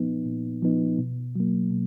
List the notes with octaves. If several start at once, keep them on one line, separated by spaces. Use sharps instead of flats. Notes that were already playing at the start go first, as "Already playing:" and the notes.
Already playing: A#2 F3 B3 D#4
A#2
F3 B3 D#4
B2
F#3 A#3
B2